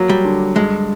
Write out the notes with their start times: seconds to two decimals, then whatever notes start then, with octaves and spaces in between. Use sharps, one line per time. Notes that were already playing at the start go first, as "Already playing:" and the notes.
Already playing: F#3 A#3
0.09 G3
0.25 D3
0.56 G2 G#3